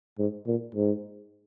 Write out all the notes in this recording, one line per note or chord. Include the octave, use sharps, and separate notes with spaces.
G#2
A#2
G#2